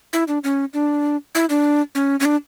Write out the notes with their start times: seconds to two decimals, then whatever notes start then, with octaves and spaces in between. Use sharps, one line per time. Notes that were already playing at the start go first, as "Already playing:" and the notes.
0.13 E4
0.28 D4
0.44 C#4
0.74 D4
1.35 E4
1.50 D4
1.95 C#4
2.20 C#4
2.25 D4